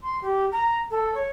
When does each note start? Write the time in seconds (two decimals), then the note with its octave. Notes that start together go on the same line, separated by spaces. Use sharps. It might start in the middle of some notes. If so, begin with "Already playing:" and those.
0.02 C6
0.22 G4
0.52 A#5
0.91 A4
1.14 C#5